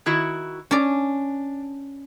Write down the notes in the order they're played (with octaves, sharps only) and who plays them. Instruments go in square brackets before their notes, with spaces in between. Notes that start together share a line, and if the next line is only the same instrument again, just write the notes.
[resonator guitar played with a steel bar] D#3 E4 F#4
[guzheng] C#4 D5 [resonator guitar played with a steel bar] D4